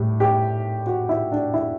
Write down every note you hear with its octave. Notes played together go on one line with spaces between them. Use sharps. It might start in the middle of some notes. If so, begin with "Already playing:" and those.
Already playing: A2 G3 G4
G4
F#4
E4
D4
E4